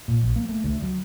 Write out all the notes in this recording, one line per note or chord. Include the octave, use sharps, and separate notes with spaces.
A#2
A#1
A#3
A3
D2
F#3